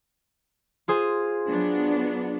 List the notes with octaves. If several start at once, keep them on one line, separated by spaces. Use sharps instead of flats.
F4 G#4 C5
F#3 B3 D4